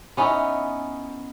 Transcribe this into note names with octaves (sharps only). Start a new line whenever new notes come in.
B3 C#4 D#4 E4